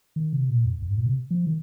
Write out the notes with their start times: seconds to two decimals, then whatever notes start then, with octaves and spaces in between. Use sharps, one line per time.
0.16 D#3
0.33 C3
0.49 A#2
0.66 F2
0.82 F2
0.91 G#2
0.98 A#2
1.06 C3
1.31 F3
1.47 D#3